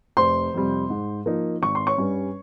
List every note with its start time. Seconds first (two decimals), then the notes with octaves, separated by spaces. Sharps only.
0.17 F1 C5 C6
0.54 F2 C3 G3
0.90 G#2
1.26 F3 A#3 D#4
1.62 G#1 C#6
1.75 C6
1.87 C#5 C#6
1.98 G2 G3 C#4